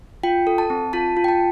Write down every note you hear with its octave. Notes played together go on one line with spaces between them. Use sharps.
F4 G5
A4
A5
C4
F4 A5
F4
G5
A5